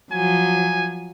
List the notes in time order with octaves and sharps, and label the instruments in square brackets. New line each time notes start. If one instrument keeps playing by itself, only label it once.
[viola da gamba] F3 F#3 [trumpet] G#5